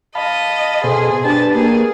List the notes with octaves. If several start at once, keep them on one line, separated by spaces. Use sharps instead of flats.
D#5 F5 A5 B5
B2 G#4 A4 C5
D4 G4 B4 A5
A#3 G#4